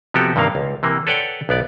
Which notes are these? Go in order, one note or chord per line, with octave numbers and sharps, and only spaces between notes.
C3 F3 B3 F#4 G4 A4
G2 C3 D#3 A#3 F5
C#2
C3 E3 A#3
A4 B4 C#5 D5 F#5 G5
B1 B3 D5